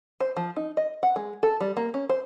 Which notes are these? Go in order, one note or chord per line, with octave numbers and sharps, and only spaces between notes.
C5
F3
D#4
D#5
F#5
G#3
A4
G3
A#3
C#4
C5